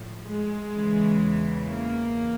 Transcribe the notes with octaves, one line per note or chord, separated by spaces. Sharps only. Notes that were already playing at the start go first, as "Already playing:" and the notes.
Already playing: A2 F3
G#3
E2 C#3 E3
A#3